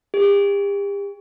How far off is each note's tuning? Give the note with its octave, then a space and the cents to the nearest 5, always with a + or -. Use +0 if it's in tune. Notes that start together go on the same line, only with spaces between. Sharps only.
G4 +40